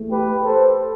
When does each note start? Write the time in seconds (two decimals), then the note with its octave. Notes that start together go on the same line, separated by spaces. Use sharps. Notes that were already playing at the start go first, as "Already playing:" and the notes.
Already playing: E2 A3
0.11 G4 B4
0.44 A4 C5